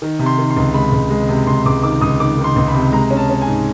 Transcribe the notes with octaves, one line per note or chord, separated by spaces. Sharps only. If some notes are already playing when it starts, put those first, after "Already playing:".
D#3
C3
C6
D#3
C6
C#2
G#3 B5
C#2
G#3
C3
C#2 C6
C#2 D6
D#3 D6
C#2 D#6
D#3 D6
D#3
C6
C#2
B5
C3
G#3 A#5
C#4
A5
C#4
G#5
G#2